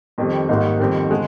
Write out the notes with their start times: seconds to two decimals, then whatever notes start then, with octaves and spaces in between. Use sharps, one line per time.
0.18 F2 D#3 G3 C4
0.49 G#1 G#2 G3 A#3 D#4
0.80 F2 D#3 G3 C4
1.10 D3 G#3